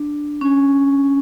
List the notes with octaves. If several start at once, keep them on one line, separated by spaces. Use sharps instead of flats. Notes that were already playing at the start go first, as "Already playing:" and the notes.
Already playing: D4
C#4